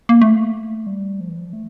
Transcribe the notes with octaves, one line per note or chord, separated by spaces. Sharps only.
A#3
A3
G3
F3
E3
F3
A3